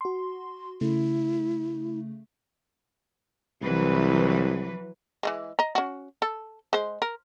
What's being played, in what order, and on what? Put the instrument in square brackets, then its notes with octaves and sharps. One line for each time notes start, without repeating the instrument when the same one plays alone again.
[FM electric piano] F#4 C6
[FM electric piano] C#3 A3 [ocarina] E4
[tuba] C2 [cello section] E3 F#3 B4
[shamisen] E3 G3 G#3
D#5 A#5
C#4 F#4
A4
G#3 C5
A#4